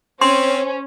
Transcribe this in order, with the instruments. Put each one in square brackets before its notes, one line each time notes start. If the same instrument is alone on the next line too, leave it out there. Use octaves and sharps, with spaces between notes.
[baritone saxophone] C4 [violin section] C#4 [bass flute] C5 [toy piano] C6